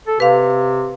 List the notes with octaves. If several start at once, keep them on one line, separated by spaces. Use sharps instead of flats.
A4
C3 B4 F5